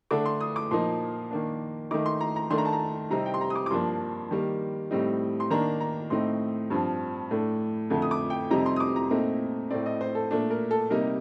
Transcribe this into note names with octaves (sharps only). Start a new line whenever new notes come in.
D3 A3 D4 D6
C6
D#6
D6
A#2 F3 A#3 D#4 C6
D#3 A#3 D4
D#3 A3 D#4 D6
C6
A#5
A#5
D#3 A3 D4 C6
A#5
A5
A#5
C3 G3 C4 D#4 A#5
G5
C6
A#5
D#6
D6
D6
G2 F3 A#3 D4 C6
D#3 G3 A#3
A2 G3 C4 D#4
C6
D#3 A#3 D4 A#5
A#5
A2 A3 C4 D#4 C6
G2 F3 C4
A2 A3 D4
F2 D3 A3
D#6
D6
G5
F2 C3 G3 C4 D#4 A#5
C6
D#6
D6
A#5
A#2 A3 C4 D#4
A2 A3 C4 D5
D#5
C5
A4
A#2 A3 D4
A#4
A4
C3 G3 A#3 D#4 A#4